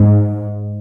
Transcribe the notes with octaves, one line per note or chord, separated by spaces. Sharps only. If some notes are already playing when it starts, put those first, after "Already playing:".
Already playing: G#2